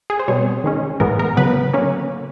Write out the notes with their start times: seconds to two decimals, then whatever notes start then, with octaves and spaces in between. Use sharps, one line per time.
0.10 G#4
0.19 C5
0.28 B2 G3 C4 C#5
0.64 D#3 G#3 C#4
1.00 A2 E3 G#3 B3 A#4
1.19 A#4
1.37 C#3 F#3 B3 B4
1.73 D3 F#3 A#3 C#4